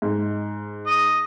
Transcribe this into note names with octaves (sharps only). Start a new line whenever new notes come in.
G#2
D#5